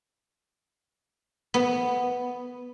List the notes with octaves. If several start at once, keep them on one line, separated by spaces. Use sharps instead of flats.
B3